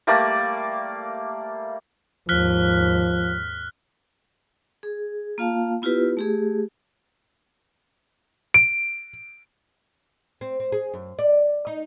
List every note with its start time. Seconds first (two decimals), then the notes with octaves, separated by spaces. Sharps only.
0.07 G3 A3 A#3 D5
2.29 D#2 G#2 F3 F6 F#6 B6
4.83 G#4
5.38 A#3 F4 F5 A5
5.82 B3 E4 F4 G4 B4
6.17 A3 G4 G#4
8.54 D7
10.41 C4
10.60 C4
10.72 G#4
10.93 F#2
11.19 D5
11.67 D#4